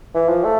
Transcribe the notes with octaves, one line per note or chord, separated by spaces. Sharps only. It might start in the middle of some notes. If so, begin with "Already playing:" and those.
E3
F3
A3